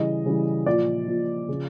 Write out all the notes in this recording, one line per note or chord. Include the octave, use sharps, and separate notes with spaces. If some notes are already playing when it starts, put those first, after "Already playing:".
Already playing: C#3 E3 G3 D#5
C#3 E3 G3
A#2 F3 D5
A#2 F3
C#3 F3